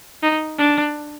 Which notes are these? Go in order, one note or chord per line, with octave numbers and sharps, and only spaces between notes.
D#4
D4